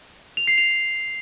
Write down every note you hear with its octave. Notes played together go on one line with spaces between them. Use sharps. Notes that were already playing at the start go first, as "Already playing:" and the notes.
F7
C7
F7